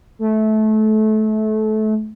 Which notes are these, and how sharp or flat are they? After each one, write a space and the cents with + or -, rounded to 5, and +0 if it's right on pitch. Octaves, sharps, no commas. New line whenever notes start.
A3 -25